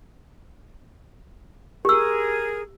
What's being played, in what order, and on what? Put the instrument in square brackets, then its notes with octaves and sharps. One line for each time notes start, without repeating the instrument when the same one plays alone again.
[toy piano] G4 E6 [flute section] G#4 A#4